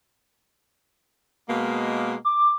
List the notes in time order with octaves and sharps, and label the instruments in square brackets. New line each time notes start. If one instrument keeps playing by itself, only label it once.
[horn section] B2 G#3 A#3
[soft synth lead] D6